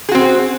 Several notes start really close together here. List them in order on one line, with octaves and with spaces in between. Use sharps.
G#4 F#4 C4